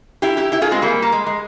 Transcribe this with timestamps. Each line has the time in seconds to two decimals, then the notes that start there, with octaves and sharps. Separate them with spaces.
0.22 E4 G4
0.37 E4 G4
0.52 E4 G4
0.62 F4 G#4
0.71 G#3 C4
0.82 G3 A#3
1.02 A#3
1.12 G#3
1.27 G#3